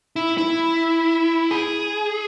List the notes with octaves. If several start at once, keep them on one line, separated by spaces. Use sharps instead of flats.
E4
E4
G#4